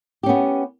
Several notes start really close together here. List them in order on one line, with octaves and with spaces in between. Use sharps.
G4 C#4 B3